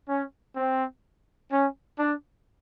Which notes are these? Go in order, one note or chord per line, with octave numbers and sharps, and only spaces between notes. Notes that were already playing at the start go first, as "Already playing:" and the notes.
C#4
C4
C#4
D4